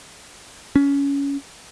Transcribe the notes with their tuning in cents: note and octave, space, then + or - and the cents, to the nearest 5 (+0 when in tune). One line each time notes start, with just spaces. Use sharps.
C#4 +20